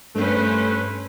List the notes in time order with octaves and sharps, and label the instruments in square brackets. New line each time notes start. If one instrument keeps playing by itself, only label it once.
[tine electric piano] G2 [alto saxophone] A3 [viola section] C#4 B4 C5